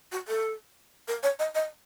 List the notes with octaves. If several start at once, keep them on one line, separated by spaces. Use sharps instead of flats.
F#4
A4
A#4
C#5
D#5
D#5